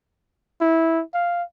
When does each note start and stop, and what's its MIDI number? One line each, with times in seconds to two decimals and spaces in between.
0.61 1.02 64
1.14 1.43 77